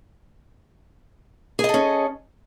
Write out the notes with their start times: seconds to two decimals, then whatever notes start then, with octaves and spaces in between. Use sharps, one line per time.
1.59 G#4
1.64 D#5
1.69 A4
1.74 C#4